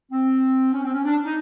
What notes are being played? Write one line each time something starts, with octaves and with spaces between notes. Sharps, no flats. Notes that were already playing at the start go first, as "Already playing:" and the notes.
C4
C#4
C4
C#4
D4
D#4